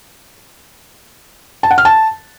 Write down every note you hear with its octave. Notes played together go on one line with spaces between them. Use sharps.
A5
F#5
F6
A5